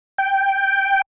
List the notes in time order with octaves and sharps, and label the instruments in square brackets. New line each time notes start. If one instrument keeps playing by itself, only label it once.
[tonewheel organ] G5